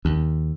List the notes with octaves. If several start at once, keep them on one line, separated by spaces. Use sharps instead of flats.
D#2